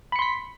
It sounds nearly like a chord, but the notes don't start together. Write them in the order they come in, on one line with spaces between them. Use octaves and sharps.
B5 C#7 C6 B6